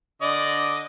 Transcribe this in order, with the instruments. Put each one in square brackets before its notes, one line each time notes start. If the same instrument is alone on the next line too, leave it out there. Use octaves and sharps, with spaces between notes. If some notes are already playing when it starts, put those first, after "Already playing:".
[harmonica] D3 D5 D#5